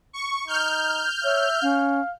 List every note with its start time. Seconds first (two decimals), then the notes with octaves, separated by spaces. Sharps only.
0.13 C#6
0.47 D#4 F6 G6
1.24 C#5 E5
1.62 C#4 F5